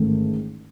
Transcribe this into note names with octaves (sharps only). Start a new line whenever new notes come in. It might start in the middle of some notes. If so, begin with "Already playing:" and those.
Already playing: A1 G#2 D#3 A3